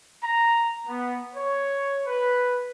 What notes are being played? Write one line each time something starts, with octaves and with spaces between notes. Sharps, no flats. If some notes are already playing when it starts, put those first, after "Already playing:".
A#5
B3
C#5
B4